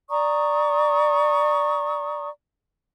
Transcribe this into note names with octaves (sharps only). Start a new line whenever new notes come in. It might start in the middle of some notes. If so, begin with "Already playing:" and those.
D5 A#5 C#6 D#6